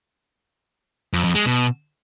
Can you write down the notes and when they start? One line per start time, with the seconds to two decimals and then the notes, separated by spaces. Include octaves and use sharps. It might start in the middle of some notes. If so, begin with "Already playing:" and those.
1.13 F2
1.24 F2
1.35 G#3
1.46 B2